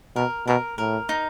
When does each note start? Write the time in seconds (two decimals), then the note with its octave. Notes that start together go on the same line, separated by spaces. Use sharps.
0.15 B2 A#4
0.47 B2 A#4
0.78 A2 A#4
1.09 D#4